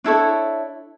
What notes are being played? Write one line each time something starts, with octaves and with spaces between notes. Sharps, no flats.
D4 E4 A4 C#5